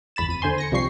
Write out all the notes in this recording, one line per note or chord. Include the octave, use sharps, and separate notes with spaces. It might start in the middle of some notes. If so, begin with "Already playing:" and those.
G1 E2 B5 A6 E7
F2 D#7
D#2 D3 C5 G#5 C6
A#6 C#7
C2 C3 F3 G3 C#6 C7